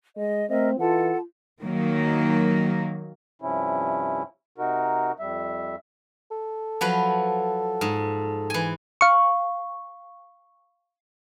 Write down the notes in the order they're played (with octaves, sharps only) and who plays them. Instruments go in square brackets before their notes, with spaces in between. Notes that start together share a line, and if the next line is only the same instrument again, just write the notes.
[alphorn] G#3 [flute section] D#5
[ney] A3 [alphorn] C4 [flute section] A#4 D#5 E5
[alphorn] E3 [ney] F4 [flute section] A4 F#5 A5
[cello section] D#3 F#3 A#3
[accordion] G2 C3 F3 C#4 E4
C3 D#4 F#4 A#4
F2 G3 E5
[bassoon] A4
[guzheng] F3 F#3 B4
G#2
E3 G#5
[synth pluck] F5 C#6